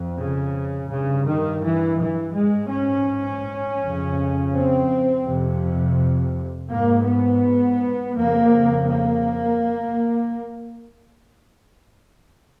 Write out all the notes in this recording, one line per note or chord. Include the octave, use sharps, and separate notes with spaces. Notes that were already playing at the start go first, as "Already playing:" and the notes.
Already playing: F2
C#3
G2 C#3
D#3
E3
E3
G#2 G#3
C#4
F2 C#3
C4
F2 C3
G#2 A#3
B3
F2 C#3 A#3
A#3